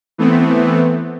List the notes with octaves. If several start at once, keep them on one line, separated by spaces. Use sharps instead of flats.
E3 A3 B3 C4